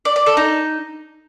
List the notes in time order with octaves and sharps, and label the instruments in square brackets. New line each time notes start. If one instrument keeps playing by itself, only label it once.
[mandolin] D5
D5
A4
D#4